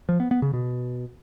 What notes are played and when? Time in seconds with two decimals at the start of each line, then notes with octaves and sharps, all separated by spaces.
0.09 F3
0.20 B3
0.31 B3
0.42 C#3
0.53 B2